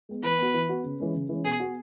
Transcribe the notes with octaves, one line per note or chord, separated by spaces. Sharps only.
G#3 B3
E3 B4
B3 F#4
E3
B3 F#4
C#3
E3 G#3 C#4
C#3
E3 G#3 C#4
B2 G#4
B3 F#4